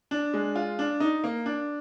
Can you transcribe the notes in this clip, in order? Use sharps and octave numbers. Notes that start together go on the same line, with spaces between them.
D4
G#3
F4
D4
D#4
A#3
D4